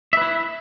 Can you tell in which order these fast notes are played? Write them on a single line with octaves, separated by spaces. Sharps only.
E5 B4 E4